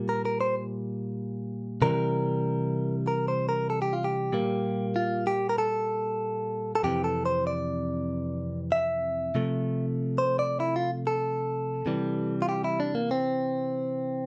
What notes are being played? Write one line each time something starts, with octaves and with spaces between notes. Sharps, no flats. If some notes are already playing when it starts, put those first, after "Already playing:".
Already playing: A#2 G3 A#3
A#4
A#4
C5
C3 E3 G3 A#4
A#4
C5
A#4
A4
G4
F4
G4
A#2 G3 A#3
F4
G4
A#4
A4
A4
F2 C3 E3 G4
A4
C5
D5
E5
C3 F3 A3
C5
D5
E4
F4
A4
C3 E3 G3
F4
G4
E4
D4
A#3
C4